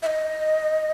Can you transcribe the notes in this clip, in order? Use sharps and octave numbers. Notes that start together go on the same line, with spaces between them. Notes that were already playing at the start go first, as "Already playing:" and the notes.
E5
D#5